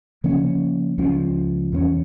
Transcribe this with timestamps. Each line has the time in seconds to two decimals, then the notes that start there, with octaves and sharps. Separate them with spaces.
0.24 C#3 F3 A#3 C#4
0.98 C#2 C#3 F3 C#4
1.72 E2 E3 A#3 C#4